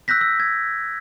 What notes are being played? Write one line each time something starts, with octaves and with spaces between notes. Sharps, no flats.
E6 F#6 G6 A#6 B6
E6
G#6